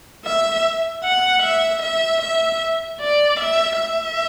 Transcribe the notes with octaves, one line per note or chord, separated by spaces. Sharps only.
E5
F#5
E5
E5
E5
D5
E5
E5